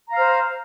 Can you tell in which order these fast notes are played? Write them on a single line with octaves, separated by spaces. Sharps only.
A#5 F5 F6 C5